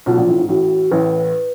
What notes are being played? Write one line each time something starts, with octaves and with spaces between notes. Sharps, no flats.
B1 B2 F4
A#1 A#2
A1 A2
G#2
A1 A2 F#4
A1 A2 B4